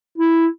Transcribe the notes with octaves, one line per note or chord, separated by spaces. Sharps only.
E4